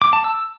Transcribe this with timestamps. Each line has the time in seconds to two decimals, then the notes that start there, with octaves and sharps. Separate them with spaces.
0.02 D6
0.13 A5
0.24 E6